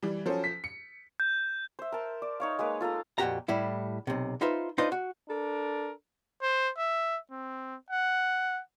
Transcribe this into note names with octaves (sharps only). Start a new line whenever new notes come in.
E3 G3
F3 F#3 C#4 A4 C5
B6
C#7
G6
C5 E5
A#4 A5
D5
D#4 C#5 F5
G#3 A#3 B4
F4 A4 F5 A#5
F2 A#2 F#4 G4 A#5
A2 G3 E4
B1 C3
D#4 F4 B4 C5 E5
D4 D#4 F4 B4 C5 D#5
F#4
D4 A4 A#4
C5
E5
C4
F#5